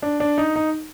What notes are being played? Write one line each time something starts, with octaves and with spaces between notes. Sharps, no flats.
D4
D4
D#4
D#4